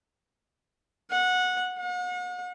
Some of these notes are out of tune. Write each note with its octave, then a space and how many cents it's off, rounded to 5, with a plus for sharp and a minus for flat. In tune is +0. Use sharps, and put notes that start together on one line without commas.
F#5 -20
F#5 -40